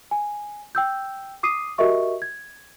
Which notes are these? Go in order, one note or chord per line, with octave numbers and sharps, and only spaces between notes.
G#5
G5 E6 G6
D6 D#6 C7 D#7
F#4 G4 A#4 D#5 E5 C#6
G#6